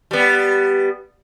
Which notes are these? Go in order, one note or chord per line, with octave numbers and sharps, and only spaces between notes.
G3 B3